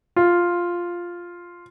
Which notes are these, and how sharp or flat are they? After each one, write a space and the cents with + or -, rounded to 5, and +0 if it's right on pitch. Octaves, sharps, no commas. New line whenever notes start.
F4 +0